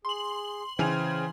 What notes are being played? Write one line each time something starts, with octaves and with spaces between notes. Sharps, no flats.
G#4 C6 F#7
C#3 E3 C5 G5 G#5 F7